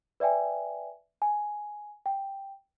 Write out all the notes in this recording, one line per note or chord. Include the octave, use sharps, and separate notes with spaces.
B4 D5 E5 G5 G#5
G#5
G5